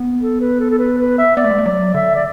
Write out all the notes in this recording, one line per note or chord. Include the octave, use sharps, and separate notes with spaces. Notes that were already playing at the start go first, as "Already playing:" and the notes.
Already playing: B3
A4
B4
A4
A4
B4
B4
E5
B3 D5
A3
G#3
A3
F#3 D5
D3 E5
D5